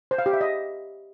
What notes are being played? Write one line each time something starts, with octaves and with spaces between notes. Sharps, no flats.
C5
F5
G4
E5
D#5